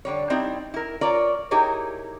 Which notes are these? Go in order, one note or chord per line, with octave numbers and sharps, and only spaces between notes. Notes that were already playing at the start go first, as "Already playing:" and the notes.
D3 G3 C#5
G3 C4 D#4 E4
E4 A#4
F4 A#4 C#5 D5
D#4 E4 G4 G#4 A#4 C#5